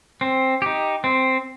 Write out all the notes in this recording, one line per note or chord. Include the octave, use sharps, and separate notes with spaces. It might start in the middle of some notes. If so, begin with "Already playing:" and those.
C4
D#4 G4
C4